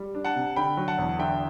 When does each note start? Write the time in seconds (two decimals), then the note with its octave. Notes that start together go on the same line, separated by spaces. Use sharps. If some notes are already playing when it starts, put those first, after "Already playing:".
Already playing: G3
0.15 D4
0.24 F#5 A5
0.36 C3
0.56 D3 G5 B5
0.77 F#3
0.88 F#5 A5
0.98 E2
1.19 D3 E5 G5